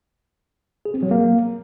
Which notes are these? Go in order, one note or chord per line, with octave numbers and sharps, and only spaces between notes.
G#4
C4
F#3
A#3